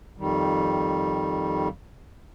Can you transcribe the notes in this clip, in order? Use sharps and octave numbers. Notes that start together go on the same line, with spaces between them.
F2 D#3 G3